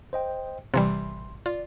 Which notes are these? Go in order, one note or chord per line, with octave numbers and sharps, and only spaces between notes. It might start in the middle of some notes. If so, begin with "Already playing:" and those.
C5 D#5 G5
A1 C3 E3 G3 C6
F4 D5